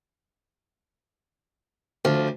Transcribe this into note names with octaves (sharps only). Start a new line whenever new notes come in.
D2 F3